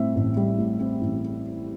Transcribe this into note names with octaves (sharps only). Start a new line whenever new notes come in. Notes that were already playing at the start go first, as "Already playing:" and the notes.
Already playing: A2 G3 C4 E5
A1
G3
A2
C4
A1